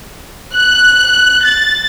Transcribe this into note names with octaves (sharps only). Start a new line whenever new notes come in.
F#6
A6